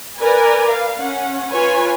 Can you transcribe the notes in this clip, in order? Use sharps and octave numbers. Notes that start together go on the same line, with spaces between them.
A#4 B4 D5 G#5
F5
C#4 F#5
F4 B4 C#5 G#5